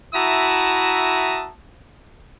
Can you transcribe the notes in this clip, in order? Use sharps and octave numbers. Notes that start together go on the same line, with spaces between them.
E4 F#4 E5 A5 A#5 D#6